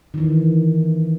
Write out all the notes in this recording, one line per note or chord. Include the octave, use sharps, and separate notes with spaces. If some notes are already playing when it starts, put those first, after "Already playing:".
D#3 E3